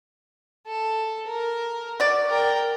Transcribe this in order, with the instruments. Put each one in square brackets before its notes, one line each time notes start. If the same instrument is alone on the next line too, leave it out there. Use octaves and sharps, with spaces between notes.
[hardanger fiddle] A4
A#4
[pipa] F#4 D5
[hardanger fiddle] A#4 G5